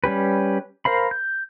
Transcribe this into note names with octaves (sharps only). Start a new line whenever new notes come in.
G3 C#4 G4 B4
A#4 C5 F5 B5
G6